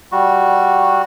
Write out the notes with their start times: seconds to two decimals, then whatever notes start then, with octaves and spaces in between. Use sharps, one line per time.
0.12 G3 F#4